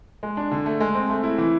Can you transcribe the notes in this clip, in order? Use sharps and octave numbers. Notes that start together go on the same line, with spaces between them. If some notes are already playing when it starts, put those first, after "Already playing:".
G#3
D4
D3
A3
G#3
C4
A3
E4
E3